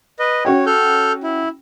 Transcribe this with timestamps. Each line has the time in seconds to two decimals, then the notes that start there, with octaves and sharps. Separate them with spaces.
0.19 B4 D#5
0.45 C#4 F#4 C#5 G5
0.66 A4 F6 G6
1.23 E4